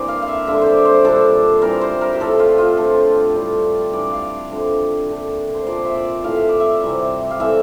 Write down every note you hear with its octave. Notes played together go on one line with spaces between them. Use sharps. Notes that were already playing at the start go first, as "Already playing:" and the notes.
Already playing: E3 A#3 C4 D4 C5 D5
F5
F5
E5
D3 G3 D4 E5
C5 D5
C5
A#2 G3 D4 A4
E3 G3 C4 A#4
C5
A#4
G4
A2 F3 A3 C4 A4
F4
F4
D3 A3 C4 A4
A2 G3 D4
E3 G3 D4 D5
F5
D3 F3 A3
A#2 A3 D4
C5
A#2 F3 C4 D5
E5
D5
A2 E3 A3 F5
E5
D5
E5
C3 E3 G3
F5
E3 A3 C4 E5